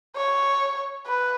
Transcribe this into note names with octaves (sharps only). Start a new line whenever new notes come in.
C#5
B4